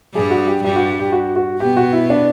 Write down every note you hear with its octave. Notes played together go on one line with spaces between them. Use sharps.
G2 G3 G#4
F#4
G4
G2 G3 G4
F#4
G4
F#4
F#4
B2 B3 G4
F#4
E4
D4